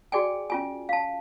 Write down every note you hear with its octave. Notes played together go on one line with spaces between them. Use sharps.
F#4 G#4 D5 G5 G#5
C#4 F4 G#5
F5 A5